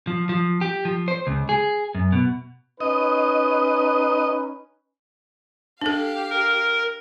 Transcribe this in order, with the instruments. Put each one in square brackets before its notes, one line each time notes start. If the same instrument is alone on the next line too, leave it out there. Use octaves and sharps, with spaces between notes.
[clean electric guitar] F3
F3
G4
F3
C5
C#2
G#4
F#2
B2
[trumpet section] C#4 D#4 B4 [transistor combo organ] D#5
[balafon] D4 A4 [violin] G4 F5
[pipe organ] A#4